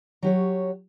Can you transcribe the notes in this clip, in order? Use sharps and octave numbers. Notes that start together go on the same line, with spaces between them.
F#3 G4 C#5